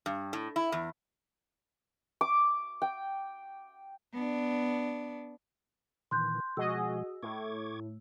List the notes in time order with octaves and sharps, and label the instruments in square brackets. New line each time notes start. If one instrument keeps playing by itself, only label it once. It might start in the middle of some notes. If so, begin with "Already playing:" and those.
[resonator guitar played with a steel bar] G2
A2
E4
E2
[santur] D6
G5
[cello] B3 D4
[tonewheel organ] A#2 D#3 E3 [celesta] C6 F#6 G6
[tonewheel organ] B2 F3 G#3 [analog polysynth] F#4 G#4 D#5 [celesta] E6
[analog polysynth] A2 [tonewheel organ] C#6 D6 G#6